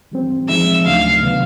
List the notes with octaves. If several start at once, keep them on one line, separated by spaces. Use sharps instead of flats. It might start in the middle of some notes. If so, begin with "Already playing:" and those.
E3 G3 C4
F3 G#3 C4 D#4 G#4 E5
D2 C#3 F#3 A3 D4 F5
C3 D#3 F#3 B3